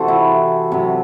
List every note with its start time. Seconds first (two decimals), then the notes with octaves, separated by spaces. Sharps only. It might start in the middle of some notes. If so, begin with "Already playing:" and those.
Already playing: C3 E3 F#4 A4 C5
0.08 E4
0.72 C3 F#3